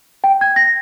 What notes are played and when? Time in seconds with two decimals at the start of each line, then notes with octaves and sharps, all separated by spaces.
0.24 G5
0.41 G#6
0.56 A#6